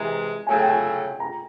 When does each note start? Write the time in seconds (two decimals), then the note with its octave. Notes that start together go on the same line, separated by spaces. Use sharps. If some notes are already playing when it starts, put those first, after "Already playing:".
Already playing: C3 E3 G#3 A#5
0.47 C#3 F#3 A3 G#5
0.58 G5
0.69 G#5
1.20 A#5